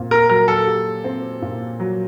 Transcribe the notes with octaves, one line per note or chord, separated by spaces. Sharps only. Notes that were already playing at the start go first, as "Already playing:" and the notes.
Already playing: A#2 C4
A#4
F#3 A#4
A4
G4
C4
A#2
F#3